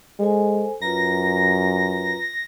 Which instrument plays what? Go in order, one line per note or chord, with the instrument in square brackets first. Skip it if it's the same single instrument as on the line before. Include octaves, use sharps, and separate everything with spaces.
[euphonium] G#3 [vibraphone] A4 C5 G#5
[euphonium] F#2 [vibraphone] F4 B4 A#5 [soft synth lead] A#6